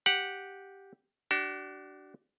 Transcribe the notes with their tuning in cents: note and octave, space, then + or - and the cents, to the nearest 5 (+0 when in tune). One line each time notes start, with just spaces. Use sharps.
G4 +0 F#5 -10
D4 +0 F#4 +40